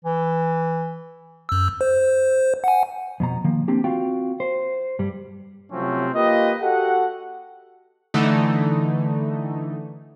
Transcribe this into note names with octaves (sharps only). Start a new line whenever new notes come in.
E3
F#2 E6
C5
F#5 G#5
F2 B2 A#5
D#3 F3 A#3
A#3 C4 D4 G4
C4 F4 F#4 F5 G5
C5
G2 G3
C3 F3 F#3 A3 C4 C#4
A#3 F4 G4 B4 D#5
F#4 G4 A4 F#5
D3 E3 A3 D#4